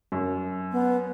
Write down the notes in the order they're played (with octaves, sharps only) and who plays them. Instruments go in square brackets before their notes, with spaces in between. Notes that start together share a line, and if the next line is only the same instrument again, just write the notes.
[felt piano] F#2
[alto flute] B3